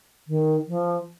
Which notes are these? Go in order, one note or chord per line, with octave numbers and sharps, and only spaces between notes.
D#3
F3